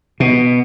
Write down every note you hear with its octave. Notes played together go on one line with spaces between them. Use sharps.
B2